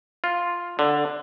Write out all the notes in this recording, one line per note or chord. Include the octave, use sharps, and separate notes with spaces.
F4
D3